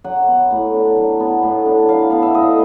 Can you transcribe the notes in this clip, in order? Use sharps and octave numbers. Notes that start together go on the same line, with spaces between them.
F#3 F#5
B3
A2
D4
F#3
B3
A2
D4
F#3 F5
B3 F5
E5
A2 D#5